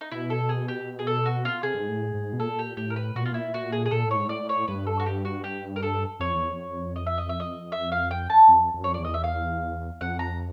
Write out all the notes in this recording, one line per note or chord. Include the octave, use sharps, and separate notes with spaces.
D#4
B2 E4
A4
G#4
G4
G#4
A4
F#4
F4
C3 G#4
G2
G#2
A2
G#2
B2
A#2 A4
G4
A2 G4
A#4
B4
A#2 F#4
B2 F4
A#2 E4
A#2 F#4
G#4
G#4
A#2 A4
A2
G#2 C#5
A2 D5
C#5
G2 B4
A4
F#4
G4
F#4
G4
A#4
A4
F2 C#5
E2
F2
D#5
E5
D#5
E5
D#5
E5
F5
G5
A5
F2
F2
F#2
F2 C#5
D5
E2
D#5
E5
F5
F2 F#5
A#5